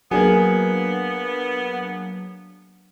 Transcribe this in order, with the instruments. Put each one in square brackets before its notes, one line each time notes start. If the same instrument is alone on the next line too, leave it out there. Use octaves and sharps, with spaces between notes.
[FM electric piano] F#3 D4 [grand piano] A#3 G#4 [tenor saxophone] B3